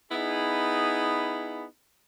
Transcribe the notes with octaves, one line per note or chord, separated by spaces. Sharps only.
B3 D#4 E4 G#4